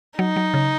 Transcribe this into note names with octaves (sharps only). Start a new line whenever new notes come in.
F#3 D#4
F#3
C#3